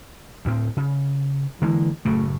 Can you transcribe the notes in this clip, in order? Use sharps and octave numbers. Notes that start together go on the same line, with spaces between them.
D2 A2 C4
C#3
D3 E3 G#3 A#3
F#1 A2 C#3 A3